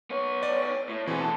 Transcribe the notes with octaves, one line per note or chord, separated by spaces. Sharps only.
B3 C#5
D5
A2
B2 E3 C4 G#4
D3 A5